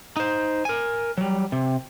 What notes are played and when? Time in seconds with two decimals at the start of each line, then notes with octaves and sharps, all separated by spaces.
0.17 D#4 C5
0.65 A#4 G#5
1.18 F#3 G3
1.52 C3